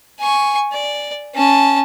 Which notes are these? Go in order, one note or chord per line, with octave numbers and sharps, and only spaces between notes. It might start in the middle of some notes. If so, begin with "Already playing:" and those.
G#5 C#6
D5
C#4 A5